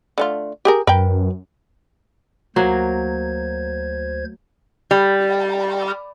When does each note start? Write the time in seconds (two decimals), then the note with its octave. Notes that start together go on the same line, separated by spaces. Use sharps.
0.18 D3 A3 F4
0.65 G4 G#4 A#4
0.87 F#2 A#4 B4 G5
2.56 D2 F#3 A#3 F#4 C5 G#6
4.91 G3